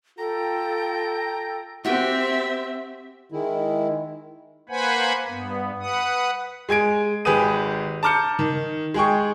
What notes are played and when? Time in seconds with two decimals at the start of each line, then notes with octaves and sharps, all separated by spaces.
0.18 F4 A4 G5 A#5
1.85 C4 F#4 G4 E5 G5
3.32 D#3 G#3 E4
4.69 A#3 B4 C5 F#5 G#5 B5
5.27 G2 B3
5.80 B4 F#5 D#6
6.69 G#3 G#5 G#6 D7
7.25 G#1 G4 G#4 B4 D#6 D#7
8.03 A5 A#5 D6 F6 G6 C#7
8.39 D#3
8.94 G#3 G#4 G5 C#6